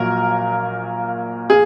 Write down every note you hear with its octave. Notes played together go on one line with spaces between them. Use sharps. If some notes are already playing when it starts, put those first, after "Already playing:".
Already playing: A#1 A#2 F#3 A#4
G#4